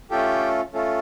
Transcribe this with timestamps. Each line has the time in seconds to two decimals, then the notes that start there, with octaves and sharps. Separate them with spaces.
0.11 A3 C#4 F4 G4 A4 G5
0.74 A3 C#4 F4 A4